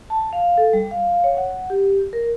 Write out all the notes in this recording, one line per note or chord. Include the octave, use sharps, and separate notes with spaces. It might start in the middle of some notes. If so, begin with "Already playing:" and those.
A5
F5
A4
G3
F5
C#5
F#5
G4
A#4